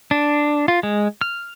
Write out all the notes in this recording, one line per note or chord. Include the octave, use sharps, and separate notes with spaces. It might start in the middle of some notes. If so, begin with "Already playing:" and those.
D4
F4
G#3
F6